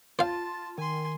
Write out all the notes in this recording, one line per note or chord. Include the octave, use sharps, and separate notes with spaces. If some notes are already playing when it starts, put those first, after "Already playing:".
F4 C5 F5 A5
D#3 G#5 C6